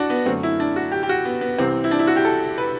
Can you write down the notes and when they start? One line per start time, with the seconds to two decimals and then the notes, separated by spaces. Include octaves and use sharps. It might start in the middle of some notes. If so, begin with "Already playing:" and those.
Already playing: D4 F#4
0.10 B3
0.26 F#2 D3 A3 C4
0.43 E4
0.60 D4
0.76 F#4
0.92 G4
1.03 G4
1.09 F#4
1.25 B3
1.41 B3
1.58 C2 C3 E3 C4
1.84 E4
1.91 D4
1.99 E4
2.07 F#4
2.16 G4
2.25 A4
2.58 B4